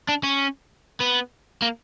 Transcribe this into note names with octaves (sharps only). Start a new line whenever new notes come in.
D4
C#4
B3
A#3